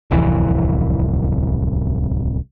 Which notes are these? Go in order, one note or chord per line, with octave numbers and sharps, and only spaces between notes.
D1 C2 F2 E3